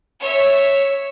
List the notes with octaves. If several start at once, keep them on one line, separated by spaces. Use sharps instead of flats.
C#5 E5